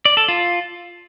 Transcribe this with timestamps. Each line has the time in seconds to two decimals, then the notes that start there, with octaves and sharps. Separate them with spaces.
0.05 D5
0.17 A4
0.28 F4